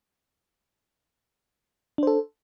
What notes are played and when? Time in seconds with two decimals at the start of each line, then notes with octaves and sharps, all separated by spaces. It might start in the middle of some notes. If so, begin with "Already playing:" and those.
1.98 D4
2.03 C5
2.07 A4